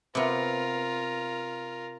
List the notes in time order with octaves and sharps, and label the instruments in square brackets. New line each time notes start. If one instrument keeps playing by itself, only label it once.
[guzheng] C3 B3 [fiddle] F4 A#4